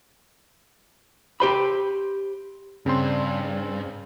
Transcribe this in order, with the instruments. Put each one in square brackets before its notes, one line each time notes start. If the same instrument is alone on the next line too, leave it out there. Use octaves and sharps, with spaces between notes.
[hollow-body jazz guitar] G4 C5 B5
[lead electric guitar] G2 [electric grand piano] C#3 C4 C6